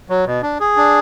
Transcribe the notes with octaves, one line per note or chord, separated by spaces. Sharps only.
F#3
B2
D4
G#4
D4